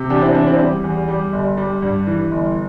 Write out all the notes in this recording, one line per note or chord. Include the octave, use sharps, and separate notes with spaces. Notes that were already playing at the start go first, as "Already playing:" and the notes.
Already playing: C3
E2 D4 G4
C4 E4
E2 D4
C4 E4
G3
E2
G3
G1
G3
G2
E3
G1